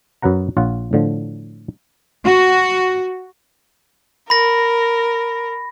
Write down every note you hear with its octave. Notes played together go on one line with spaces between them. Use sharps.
F#2 F#3 B4 F#5 A#5
A#1 F4 C#5 F#5
A2 D3 F3
F#4
A#4 B5 A#6